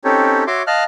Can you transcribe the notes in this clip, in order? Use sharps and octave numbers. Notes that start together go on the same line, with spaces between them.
C4 C#4 D#4 G4 A4 C#5
F#4 C#5 E5 C6 D6
D#5 F5 A5 F6 F#6